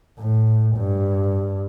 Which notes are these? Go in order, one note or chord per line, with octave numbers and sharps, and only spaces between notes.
A2
G2